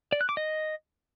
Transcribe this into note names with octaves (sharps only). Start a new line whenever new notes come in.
D5
F#6
D6
D#5